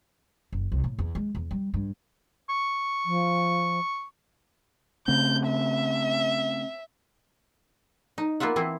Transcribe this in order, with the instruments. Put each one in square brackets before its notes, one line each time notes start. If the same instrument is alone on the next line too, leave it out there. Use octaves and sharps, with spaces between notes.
[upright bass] F#1
C2
A2
E2
G#3
E2
G3
G2
[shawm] C#6
[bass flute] F3
[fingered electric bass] C#3 A3 C4 [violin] G6
[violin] E5
[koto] D#4
A#3 B3 F4 E5 F#5
E3 C4 E4